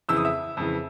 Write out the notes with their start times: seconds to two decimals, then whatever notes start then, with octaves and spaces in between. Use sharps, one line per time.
0.09 F2 C#3 E3 E6
0.17 D#6
0.25 E5 E6
0.57 F2 C#3 E3